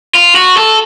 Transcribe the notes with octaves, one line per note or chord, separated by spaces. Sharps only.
F4
F#4
A4